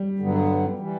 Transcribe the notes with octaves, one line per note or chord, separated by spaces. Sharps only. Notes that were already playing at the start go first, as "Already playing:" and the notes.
Already playing: G3
G2 D3 F#3 B3
E3 G3